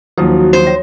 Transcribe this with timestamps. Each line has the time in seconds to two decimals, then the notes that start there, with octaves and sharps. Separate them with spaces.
0.18 D#2 F3 F#3 F#4
0.53 C5
0.67 C#5